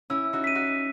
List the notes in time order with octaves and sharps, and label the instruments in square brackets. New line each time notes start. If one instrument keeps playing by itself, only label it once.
[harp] C#4 E4 [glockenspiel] E6
[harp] D#4 F#4
[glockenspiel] B6 D#7
[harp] D#4 F#4